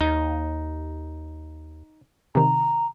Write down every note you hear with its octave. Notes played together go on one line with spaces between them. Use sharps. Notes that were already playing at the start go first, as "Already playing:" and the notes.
D#2 D#4
C3 D#3 A#5